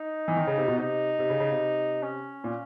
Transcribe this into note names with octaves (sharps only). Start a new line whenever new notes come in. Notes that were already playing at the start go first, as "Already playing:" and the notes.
Already playing: D#4
E3
D#3
C#3
C3
B2
C3 D#4
C3
C#3
C#3
C3
C#4
A#2